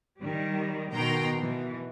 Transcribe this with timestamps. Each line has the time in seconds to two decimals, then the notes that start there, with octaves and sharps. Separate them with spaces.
0.20 D#3 G3
0.92 B2 D#3 G5 A#5 C6
1.38 B2 E3